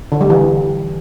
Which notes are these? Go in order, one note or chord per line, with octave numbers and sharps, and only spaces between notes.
D3
G3
E3